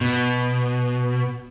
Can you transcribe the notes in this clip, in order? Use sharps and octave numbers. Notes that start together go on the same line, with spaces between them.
B2